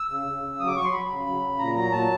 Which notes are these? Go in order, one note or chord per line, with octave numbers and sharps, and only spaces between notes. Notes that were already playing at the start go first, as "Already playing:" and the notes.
Already playing: E6
C#3
C#3
C#3
F#3 D#6
D6
F#3 C#6
C6
F#3 B5
C#3
F#3
C#3
A#2 A#5
F#3 A#5
A#2 A5